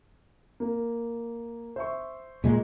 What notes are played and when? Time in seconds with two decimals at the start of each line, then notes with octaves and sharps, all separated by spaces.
0.60 A#3
1.76 C5 E5 C#6
2.44 A#2 G#3